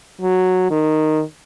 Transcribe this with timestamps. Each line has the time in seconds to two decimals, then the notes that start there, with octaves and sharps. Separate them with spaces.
0.21 F#3
0.70 D#3